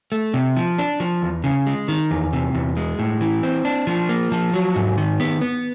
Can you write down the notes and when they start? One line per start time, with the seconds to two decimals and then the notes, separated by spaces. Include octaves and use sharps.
0.12 A3
0.34 C3
0.57 F3
0.79 D4
1.00 F3
1.22 E2
1.44 C#3
1.66 G#3
1.88 D#3
2.11 E2
2.33 C3
2.55 E2
2.77 G#3
2.99 A2
3.21 E3
3.43 C4
3.65 D4
3.87 F3
4.09 A#3
4.32 F3
4.53 F#3
4.76 G#2
4.98 D#3
5.20 B3
5.41 B3